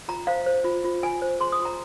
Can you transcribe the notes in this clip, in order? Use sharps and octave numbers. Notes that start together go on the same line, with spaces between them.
F4 A#5
C5 F5
C5
F4
F4
F4 G#5
C5
G#4 C6
D#6
F4
A#5